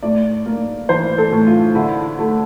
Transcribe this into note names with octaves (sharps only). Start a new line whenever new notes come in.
A2 D5
A#3
E3 C5
A4
A2
F4
D3 E4
A3